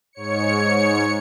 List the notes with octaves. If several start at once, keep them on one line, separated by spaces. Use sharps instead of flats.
G#2 C#5 C#7